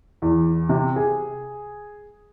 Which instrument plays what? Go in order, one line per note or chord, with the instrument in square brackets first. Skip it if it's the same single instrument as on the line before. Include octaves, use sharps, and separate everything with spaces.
[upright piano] E2
C3
G#4